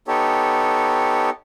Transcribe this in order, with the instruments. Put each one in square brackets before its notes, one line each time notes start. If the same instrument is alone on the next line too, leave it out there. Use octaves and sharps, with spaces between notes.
[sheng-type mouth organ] B3 D#4 G4 A4 C#5